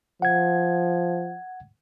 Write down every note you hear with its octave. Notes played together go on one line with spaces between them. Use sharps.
F3 F#5 G#6